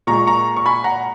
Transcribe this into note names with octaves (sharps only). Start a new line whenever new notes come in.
A#2 G#3 A#5 C#6
A#5 C#6
C#6
G#5 B5
F#5 A#5